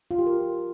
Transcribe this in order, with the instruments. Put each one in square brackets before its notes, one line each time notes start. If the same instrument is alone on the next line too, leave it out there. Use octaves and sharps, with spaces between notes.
[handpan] F4
G4
A#4